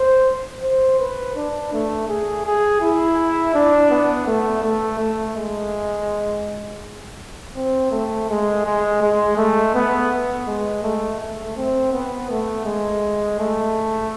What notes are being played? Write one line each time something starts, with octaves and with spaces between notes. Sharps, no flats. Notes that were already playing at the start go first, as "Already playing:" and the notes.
Already playing: C5
C5
B4
D4
A3
G#4
G#4
E4
D4
B3
A3
A3
A3
G#3
C4
A3
G#3
G#3
G#3
A3
B3
G#3
A3
A3
C4
B3
A3
G#3
A3